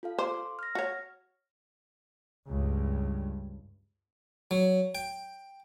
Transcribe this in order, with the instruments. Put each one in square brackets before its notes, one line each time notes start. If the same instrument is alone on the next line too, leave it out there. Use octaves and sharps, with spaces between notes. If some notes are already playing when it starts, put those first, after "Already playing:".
[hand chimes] F4 A4 F5
[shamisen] C5 [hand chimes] C6 D6
[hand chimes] F6 A#6
[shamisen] F#4 C#5
[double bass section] C#2 G2
[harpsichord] F#3
G5